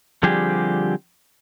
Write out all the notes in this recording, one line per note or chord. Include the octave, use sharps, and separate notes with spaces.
D3 F3 G3 C4 G4 G#4